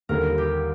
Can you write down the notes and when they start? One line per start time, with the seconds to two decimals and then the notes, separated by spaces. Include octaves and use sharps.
0.09 D#2 D3 G3 A#3 A#4
0.38 G4